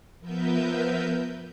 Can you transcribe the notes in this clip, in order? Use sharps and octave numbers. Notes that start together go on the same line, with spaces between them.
F3 B3 A#4 B4 E5 G6